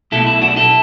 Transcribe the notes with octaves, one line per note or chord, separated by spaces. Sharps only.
B1 B2 A3 E4 A4
E4
D4 F#4
E4 A4